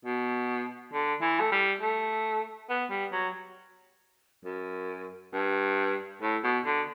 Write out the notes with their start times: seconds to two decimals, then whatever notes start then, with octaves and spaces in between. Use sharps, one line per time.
0.05 B2
0.93 D3
1.22 E3
1.40 A3
1.52 G3
1.81 A3
2.70 B3
2.90 G3
3.13 F#3
4.45 F#2
5.33 G2
6.22 A2
6.44 B2
6.66 D3